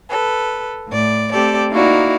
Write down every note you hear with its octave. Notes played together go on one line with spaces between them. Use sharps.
A4 B4
A2 D5
A3 C4 G4 A4 D5
A#3 D#4 E4 F#4 D5 F5